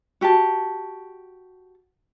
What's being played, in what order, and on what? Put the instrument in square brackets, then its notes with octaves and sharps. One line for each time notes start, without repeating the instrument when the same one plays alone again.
[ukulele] F#4 G4 F#5 A5